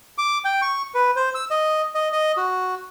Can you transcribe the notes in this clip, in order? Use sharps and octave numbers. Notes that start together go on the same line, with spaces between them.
D6
G5
C#6
B4
C5
E6
D#5
D#5
D#5
F#4